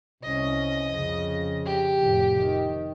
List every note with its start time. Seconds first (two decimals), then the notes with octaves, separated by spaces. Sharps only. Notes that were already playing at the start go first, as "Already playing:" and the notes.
0.23 C2 C#4 D#5
0.88 F2 C#3
1.66 G4
2.00 F1 A2
2.40 D#3